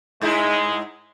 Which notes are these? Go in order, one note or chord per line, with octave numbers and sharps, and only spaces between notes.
G#2 G#3 D#4 E4